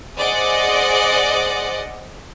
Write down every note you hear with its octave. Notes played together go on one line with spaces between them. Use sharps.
G#4 C5 D5 D#5 F#5 D#6